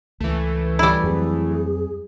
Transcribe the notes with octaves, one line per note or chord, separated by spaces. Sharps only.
C#2 E3 A3
G3 E4
F2 F#3 C4 G#4